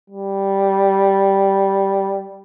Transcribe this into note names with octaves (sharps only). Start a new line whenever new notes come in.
G3